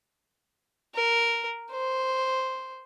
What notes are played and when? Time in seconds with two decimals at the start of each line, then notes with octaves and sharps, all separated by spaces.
0.95 A#4
1.71 C5